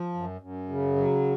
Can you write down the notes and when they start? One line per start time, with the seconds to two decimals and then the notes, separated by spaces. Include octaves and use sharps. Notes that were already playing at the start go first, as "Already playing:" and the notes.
Already playing: F3
0.14 F#2
0.41 F#2
0.69 C#3
0.96 F#3